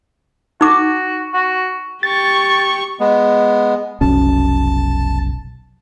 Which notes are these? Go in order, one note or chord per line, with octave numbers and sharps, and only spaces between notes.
D#4 F#4 D6
F#4
G4 C#6 A6
G#3 B3
F1 B1 C#4 A5